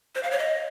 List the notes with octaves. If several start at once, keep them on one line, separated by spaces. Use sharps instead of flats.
C5
F5
C#5
D#5